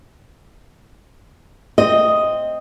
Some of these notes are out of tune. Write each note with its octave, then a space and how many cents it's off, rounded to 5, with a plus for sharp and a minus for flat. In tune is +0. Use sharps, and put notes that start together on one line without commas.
C4 +5 D#5 +0